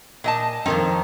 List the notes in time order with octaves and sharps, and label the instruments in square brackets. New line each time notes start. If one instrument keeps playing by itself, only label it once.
[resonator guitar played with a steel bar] A#2 D#5 A5
[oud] F2 D#3 D#4 [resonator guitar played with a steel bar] C4